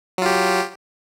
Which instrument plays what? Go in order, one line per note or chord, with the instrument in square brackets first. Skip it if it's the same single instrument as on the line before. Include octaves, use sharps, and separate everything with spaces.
[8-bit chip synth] F#3
F4
G4